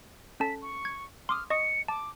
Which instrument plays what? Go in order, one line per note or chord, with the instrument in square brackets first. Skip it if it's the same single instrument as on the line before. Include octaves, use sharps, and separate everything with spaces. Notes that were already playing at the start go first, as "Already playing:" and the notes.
[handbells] C#4 A4 A5 [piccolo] B6
[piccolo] C#6
[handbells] G#6
[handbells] C6 D6 D#6 [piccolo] F6
[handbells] D#5 C#6 D#6 [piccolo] C#7
[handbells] A5 [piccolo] D6